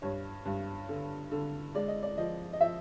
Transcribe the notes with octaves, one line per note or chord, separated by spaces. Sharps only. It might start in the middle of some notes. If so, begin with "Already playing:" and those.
G2 C#5
G2
D3
D3
G#3 D5
D#5
D5
F3 D#5
D#5
F3 E5